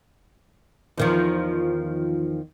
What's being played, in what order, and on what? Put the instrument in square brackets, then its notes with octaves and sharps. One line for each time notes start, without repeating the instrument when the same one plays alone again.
[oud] E2 D#3 F3